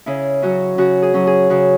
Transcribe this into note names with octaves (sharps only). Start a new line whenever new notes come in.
C#3 E4
F#3 C#4 F#4
C#3 F#4
G#4
F#3 C#4
G#4
C#3 F#4